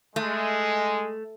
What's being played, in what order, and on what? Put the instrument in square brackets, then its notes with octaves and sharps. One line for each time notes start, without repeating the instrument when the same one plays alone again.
[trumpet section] G#3 [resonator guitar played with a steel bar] A3